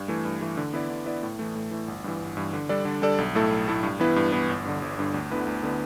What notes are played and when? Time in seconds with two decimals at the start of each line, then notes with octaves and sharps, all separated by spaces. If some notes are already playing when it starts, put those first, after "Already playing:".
Already playing: G2
0.08 E3 A3
0.25 G2
0.41 E3 A3
0.57 D3
0.73 B3 E4 B4 D5
0.90 D3
1.06 B3 E4 B4 D5
1.23 A2
1.39 E3 A3
1.56 A2
1.71 E3 A3
1.88 G1
2.04 G2 E3
2.21 G1
2.37 G2 E3
2.53 D3
2.69 G3 D4 A4 D5
2.85 D3
3.02 G3 D4 A4 D5
3.18 B1
3.35 A2 A3 E4 A4
3.51 B1
3.68 A2 A3 E4 A4
3.83 G2
4.00 E3 B3 E4 B4
4.16 G2
4.32 E3 B3 E4 B4
4.49 G1
4.65 G2 D3
4.82 G1
4.99 G2 D3
5.14 D2
5.31 D3 B3 E4 B4
5.47 D2
5.63 D3 B3 E4 B4